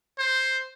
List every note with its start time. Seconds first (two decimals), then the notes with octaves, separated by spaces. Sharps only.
0.19 C5